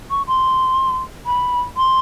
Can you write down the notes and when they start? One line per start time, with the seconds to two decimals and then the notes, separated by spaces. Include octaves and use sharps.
0.10 C#6
0.27 C6
1.26 B5
1.76 C6